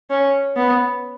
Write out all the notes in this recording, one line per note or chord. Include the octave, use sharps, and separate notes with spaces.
C#4
B3